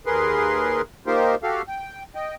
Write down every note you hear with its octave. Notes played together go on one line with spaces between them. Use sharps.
D#2 G#4 A#4 B4 C6
A#3 D#4 F4 G4 A#4 C5
F#4 G4 A4 F5
G5
D#5 G5